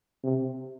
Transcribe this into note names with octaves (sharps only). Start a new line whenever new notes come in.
C3